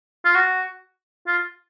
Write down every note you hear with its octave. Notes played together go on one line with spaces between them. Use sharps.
F4
F#4
F4